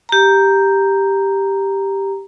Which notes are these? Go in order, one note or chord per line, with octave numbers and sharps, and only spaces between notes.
G4 A#5